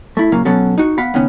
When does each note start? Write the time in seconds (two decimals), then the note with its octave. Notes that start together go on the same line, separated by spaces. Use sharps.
0.17 A3 E4
0.32 A#2 C#3 F#3 A#3
0.45 B2 F#3 B3 C#4 A4
0.78 D#4 F#4
0.98 B3 F5 F#5 B5
1.14 C#2 D#3 B3 C#4